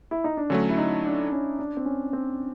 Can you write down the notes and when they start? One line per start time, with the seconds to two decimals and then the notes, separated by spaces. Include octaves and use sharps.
0.11 E4
0.24 D#4
0.37 D4
0.50 D3 F#3 A3 C#4
0.69 E4
0.78 D#4
1.05 D4
1.32 C#4
1.59 D4
1.77 C4
1.86 C#4
2.13 C4